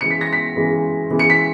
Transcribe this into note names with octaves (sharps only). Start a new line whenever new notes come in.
C#3 E3 G#3 C#7
B6
A#6
B6
C#3 E3 G#3
C#3 E3 G#3
C#7
B6